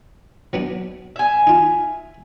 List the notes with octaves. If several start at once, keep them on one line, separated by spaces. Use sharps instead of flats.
F#3 B3 D4
E5 G#5
D#4 F4